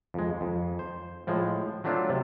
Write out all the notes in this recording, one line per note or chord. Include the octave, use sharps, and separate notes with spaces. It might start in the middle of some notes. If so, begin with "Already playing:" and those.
F2 G#3
F2
C5
A2 F3 G#3
F#3 A3 C4 D4 F4
C3